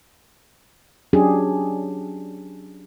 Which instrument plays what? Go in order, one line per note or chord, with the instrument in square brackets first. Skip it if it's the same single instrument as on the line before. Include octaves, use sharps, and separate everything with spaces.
[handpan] F#3 C#4 D4 G4 G#4